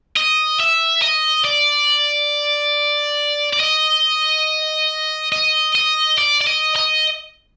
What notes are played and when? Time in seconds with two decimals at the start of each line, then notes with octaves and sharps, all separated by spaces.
0.17 D#5
0.60 E5
1.02 D#5
1.45 D5
3.53 D5
3.60 D#5
5.32 D#5
5.75 D#5
6.18 D5
6.41 D5
6.47 D#5
6.76 D#5